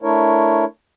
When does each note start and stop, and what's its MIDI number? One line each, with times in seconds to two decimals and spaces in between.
0.02 0.65 57
0.02 0.65 62
0.02 0.65 64
0.02 0.65 70
0.02 0.65 73